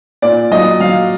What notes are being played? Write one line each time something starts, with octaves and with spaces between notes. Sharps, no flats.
A#2 D5
F#3 D#5
F#3 F5